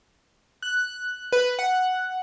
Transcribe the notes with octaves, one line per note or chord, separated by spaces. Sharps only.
F#6
B4
F#5